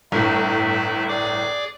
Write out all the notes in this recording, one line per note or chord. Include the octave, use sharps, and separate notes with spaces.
G1 A2 A3 E4 E5
G#4 D5 D6